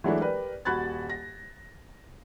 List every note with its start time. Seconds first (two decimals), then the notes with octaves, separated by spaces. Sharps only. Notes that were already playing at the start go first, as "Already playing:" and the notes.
0.04 E3 F#3 G#3 A3 D4 E4
0.20 G4 A#4 B4 D5
0.65 D#1 F#4 B5 F#6 G#6 A6
1.09 A#6